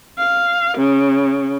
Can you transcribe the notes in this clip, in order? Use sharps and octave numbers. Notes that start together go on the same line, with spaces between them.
F5
C#3